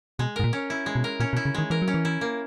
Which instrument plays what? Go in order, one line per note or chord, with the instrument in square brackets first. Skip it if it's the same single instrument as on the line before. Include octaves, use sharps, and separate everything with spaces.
[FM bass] B2 [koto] G#3
[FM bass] G#2 [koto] A#4
[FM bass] A#2
[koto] C#4
E4
G#3
[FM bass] B2
[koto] A#4
[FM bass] A#2 [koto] C#4
[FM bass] B2
[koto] E4
[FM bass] C#3
[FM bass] D#3 [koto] G#3
[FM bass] E3 [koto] A#4
[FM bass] F#3
[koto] C#4
[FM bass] E3
[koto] E4
A#3